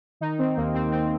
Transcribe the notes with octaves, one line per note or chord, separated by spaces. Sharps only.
D#3 D#4
D#3 C4
D#2 A#3
D#2 C4
D#3 C4